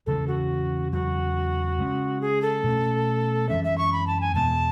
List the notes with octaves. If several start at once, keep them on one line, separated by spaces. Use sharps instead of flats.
E2 C#3 E3 G#3 A4
F#4
E2 C#3 F#3 F#4
C#3 G#3 C#4
G#4
A4
B2 A3 C#4
F#2 E3 G#3 C#4 E5
E5
C#6
B5
A5
G#5
E2 B2 G#3 B3 A5